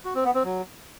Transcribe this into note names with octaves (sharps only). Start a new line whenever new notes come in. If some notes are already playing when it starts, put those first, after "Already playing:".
F#4
C4
B3
C4
F#3